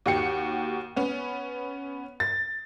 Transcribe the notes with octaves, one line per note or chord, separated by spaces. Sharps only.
D#2 F#4 G4 C#7
B3 C#4
A6